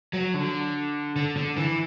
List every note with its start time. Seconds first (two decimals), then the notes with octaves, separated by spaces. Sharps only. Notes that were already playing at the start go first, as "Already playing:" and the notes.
0.13 F#3
0.34 D3
1.16 D3
1.37 D3
1.57 E3